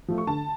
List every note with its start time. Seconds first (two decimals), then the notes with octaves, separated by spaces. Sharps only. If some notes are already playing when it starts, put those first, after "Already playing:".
0.08 F3 A3
0.18 C#6
0.27 D3 A5